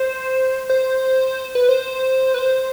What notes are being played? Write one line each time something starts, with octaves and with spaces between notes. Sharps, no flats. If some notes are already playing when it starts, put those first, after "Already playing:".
Already playing: C5
C5
B4
C5
B4
C5